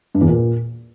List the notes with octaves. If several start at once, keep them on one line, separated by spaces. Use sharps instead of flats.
G2
E2
A#2